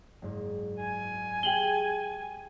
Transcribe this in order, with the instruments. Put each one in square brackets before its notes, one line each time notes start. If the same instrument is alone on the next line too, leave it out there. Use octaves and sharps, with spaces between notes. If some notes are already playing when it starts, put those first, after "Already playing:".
[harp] F#1 G#2
[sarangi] G#5
[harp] G4 G#4 F5 [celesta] G5 F#7 G7